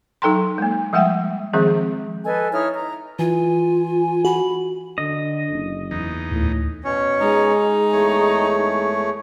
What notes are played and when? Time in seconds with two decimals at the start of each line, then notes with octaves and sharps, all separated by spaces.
0.22 F#3 D#4 A4 G5 A#5 C6
0.58 G#3 A#3
0.93 F3 G3 G#3 E5 F#5 G5
1.53 D#3 F3 G#3 C4 G#4
2.24 A4 B4 D#5 G#5
2.53 D#4 E4 C#5 F6
2.75 A#5
3.19 E3 F4 G#5
4.25 F#4 B5
4.98 D3 D#5
5.51 F#1
5.91 E2 D#4
6.31 D2 A2
6.84 B2 C#4 C#5
7.20 G#3 D#4
7.93 E2 A3 C#5